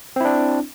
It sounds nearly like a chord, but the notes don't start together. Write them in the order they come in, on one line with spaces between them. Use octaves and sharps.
C4 E4 D4